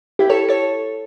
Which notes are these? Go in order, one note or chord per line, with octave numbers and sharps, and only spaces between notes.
E4 G4
A4 C#5
A4 C#5